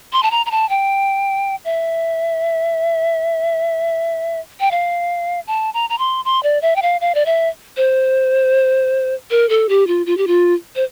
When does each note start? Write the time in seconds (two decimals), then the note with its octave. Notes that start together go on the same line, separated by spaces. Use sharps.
0.13 C6
0.23 A5
0.31 A#5
0.46 A#5
0.51 A5
0.70 G5
1.65 E5
4.60 G5
4.71 F5
5.47 A5
5.74 A#5
5.90 A#5
5.98 C6
6.25 C6
6.43 D5
6.62 E5
6.76 G5
6.82 F5
7.01 F5
7.15 D5
7.26 E5
7.77 C5
9.31 A#4
9.49 A4
9.69 G4
9.87 F4
10.06 F4
10.18 G4
10.27 F4
10.76 C5